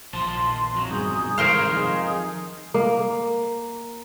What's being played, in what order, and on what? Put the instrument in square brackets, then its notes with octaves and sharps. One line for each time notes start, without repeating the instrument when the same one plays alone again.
[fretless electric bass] A#1 [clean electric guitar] D#2 C5 A5 [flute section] C6
[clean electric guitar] F2 F#3
[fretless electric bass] G2 B2 D#3 [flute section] G#4 D#6 G6
[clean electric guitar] C2 C#5 [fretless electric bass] G#2 D#3 [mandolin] A#4 C5 F5
[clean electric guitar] F2 [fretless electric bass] D#3 [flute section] D#4 G#4
[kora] A#3